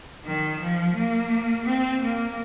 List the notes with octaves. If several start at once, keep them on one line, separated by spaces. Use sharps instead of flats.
D#3
F3
A#3
C4
A#3